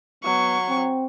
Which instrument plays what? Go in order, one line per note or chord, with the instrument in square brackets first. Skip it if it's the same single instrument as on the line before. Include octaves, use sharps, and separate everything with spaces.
[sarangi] F#3 [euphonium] B3 [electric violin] C#6
[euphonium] C4